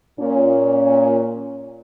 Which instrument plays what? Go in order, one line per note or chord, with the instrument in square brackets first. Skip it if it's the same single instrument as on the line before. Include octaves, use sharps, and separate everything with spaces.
[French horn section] A#2 C#4